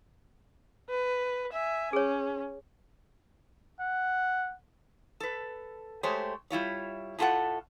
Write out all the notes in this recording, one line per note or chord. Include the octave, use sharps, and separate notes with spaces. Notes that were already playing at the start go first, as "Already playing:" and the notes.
B4
E5 G#5
C#4 G#4 C#5
F#5
A4 B4
G#3 A3 G4 C5 C#5
G3 E4 F4 C#5
A2 A3 F4 F#4 A4 F#5